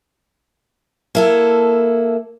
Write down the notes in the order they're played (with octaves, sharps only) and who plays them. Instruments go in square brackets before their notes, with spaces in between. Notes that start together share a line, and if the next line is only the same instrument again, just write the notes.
[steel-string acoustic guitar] A#3 E4 A4